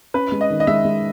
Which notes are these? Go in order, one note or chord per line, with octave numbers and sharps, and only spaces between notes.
C#4 B4
G#3
D#5
D#3
D#5
G#3 E5
G#3